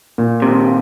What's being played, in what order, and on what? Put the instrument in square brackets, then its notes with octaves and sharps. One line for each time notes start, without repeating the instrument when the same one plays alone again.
[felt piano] A#2
[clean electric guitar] D#2 C3